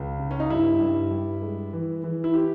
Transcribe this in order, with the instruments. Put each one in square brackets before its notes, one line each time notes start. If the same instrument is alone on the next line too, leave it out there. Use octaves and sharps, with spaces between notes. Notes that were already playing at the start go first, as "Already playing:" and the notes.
Already playing: [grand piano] C#2
C#3
C#4
D#4
G2 E4
G2
G2
G#3
E3
E3
E4
G4